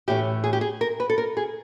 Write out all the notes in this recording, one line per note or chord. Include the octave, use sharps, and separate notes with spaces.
A2 E3 A3 C#4 G4
G#4
G4
G#4
A#4
B4
A4
A#4
G#4